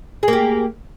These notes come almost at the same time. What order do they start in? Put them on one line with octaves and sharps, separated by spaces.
G#4 A#3 G4